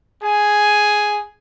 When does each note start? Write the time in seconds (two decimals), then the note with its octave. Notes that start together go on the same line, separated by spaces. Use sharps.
0.22 G#4 G#5